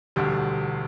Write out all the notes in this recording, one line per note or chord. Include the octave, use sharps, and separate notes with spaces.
E1 D2 D3 G3